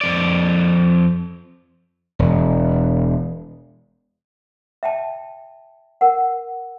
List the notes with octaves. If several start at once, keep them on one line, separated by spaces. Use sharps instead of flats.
F2 D5
E1
E5 G5 A5
A#4 F#5